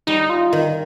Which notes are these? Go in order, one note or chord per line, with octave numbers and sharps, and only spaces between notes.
G3 D#4
F4
D#3 D#4